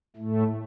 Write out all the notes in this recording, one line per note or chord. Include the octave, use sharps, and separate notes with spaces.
A2 A3